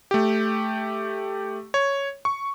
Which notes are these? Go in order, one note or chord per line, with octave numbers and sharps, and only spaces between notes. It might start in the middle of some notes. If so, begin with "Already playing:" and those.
A3 G4
C#5
C#6